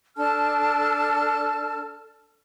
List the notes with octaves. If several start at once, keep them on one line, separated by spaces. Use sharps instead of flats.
D4 A4 A5 F6